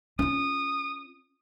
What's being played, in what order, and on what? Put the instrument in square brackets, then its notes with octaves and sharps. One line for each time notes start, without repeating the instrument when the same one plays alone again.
[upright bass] C#4 F4 [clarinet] D#6